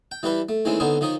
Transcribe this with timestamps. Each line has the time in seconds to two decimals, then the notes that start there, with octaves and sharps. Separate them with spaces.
0.11 G5
0.23 E3 G3 G4 B4 E5
0.49 A3
0.65 D#3 E3 G#3 A3 C4 C#4
0.80 D3 B3 C4 D#4 C#5 G#5
1.01 D#3 F3 D#4 C#5 D#6